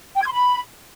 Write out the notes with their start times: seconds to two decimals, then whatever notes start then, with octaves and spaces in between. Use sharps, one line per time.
0.15 G5
0.21 G#6
0.27 C6
0.33 B5